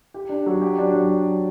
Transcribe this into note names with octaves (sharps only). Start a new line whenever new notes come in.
G4
D4
F#3
G4
D4
F#3